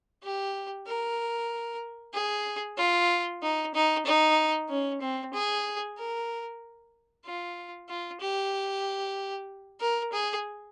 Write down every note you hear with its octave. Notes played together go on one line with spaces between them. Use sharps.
G4
A#4
G#4
F4
D#4
D#4
D#4
C#4
C4
G#4
A#4
F4
F4
G4
A#4
G#4